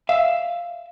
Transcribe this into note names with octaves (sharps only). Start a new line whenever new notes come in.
E5 F5